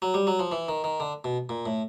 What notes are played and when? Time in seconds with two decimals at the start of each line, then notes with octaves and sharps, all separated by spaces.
0.02 F#3
0.14 G3
0.27 F#3
0.39 F3
0.52 E3
0.69 D#3
0.84 D#3
1.00 D3
1.24 B2
1.49 A#2
1.66 A2